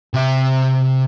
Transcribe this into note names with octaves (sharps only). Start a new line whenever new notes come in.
C3 E5